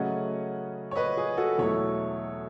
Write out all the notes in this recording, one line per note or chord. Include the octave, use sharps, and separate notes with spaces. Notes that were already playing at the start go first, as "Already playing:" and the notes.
Already playing: C#3 F#3 A3 C#4 D#5 F#5
C#5
B4 D#5
G#4
F#4 A4
E2 B2 F#3 A3 E4 A4 C#5